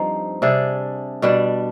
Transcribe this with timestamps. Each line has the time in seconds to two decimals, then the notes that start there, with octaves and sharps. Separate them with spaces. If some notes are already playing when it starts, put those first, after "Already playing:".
Already playing: G2 F3 C4 D#4
0.42 C3 G3 D4 G#4
1.22 B2 G3 D4